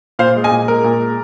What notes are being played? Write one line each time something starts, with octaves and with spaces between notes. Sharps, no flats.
A#2 C5 F5
G#3
D#5 G#5
A#2
G#3 A#4
A#2
G#3